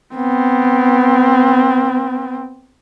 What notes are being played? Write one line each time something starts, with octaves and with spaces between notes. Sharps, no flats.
B3 C4